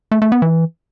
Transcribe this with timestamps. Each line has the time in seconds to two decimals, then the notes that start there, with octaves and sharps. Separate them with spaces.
0.11 A3
0.22 A3
0.32 B3
0.42 E3